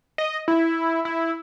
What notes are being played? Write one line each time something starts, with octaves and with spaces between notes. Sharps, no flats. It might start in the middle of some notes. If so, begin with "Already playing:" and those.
D#5
E4
E4